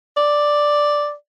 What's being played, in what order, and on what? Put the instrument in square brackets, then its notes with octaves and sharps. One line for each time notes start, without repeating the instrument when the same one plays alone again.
[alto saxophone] D5